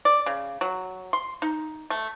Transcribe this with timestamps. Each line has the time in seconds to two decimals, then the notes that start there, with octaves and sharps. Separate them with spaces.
0.05 D5
0.26 C#3
0.61 F#3
1.13 C6
1.42 D#4
1.90 A3